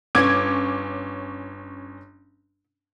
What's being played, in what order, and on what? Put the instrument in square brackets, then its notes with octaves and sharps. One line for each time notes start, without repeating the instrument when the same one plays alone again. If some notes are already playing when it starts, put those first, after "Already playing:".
[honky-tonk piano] G1 C#4 D6 G#6